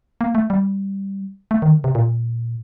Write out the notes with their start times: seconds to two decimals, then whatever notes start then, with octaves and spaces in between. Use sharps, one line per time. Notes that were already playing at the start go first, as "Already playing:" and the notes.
0.21 A#3
0.35 A3
0.50 G3
1.51 A3
1.62 D#3
1.72 D3
1.84 C3
1.95 A#2